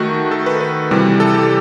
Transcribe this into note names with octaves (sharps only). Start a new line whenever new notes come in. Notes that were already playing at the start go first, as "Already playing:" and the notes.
Already playing: D#3 A3 F#4
A4
B4
B4
C3 E3 G3
A4
G4